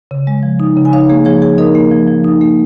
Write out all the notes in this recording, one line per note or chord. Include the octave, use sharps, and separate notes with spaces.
C#3
G#3
F3
D#4
C#3
G#5
D#4 C#5 F5
A#3 G#4 C#5
F3 G#4 C#5
F3 G#4 C#5
D#4 A#4 D#5
A#3
F3
F3
D#4
A#3